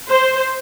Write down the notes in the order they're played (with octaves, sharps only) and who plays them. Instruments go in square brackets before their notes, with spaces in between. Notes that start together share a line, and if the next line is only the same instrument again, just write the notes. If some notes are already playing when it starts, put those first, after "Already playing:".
[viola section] C5